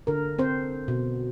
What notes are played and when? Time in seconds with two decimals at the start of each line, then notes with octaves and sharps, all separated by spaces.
0.07 D3 A#4
0.39 C4 C5
0.88 B2